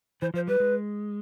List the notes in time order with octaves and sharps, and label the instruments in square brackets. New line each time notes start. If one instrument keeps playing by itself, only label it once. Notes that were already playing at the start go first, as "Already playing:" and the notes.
[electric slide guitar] E3 [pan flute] C5
[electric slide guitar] F3 [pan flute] C5
[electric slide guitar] G3 [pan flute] B4
[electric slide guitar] G#3